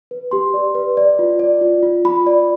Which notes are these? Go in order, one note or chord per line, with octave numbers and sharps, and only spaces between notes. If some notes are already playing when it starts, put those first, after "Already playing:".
B4
G4 C6
D5
B4
D5
F4
D5
F4
F4
F4 B5
D5